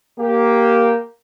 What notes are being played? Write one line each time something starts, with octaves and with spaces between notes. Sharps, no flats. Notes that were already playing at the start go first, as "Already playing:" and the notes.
A#3 G4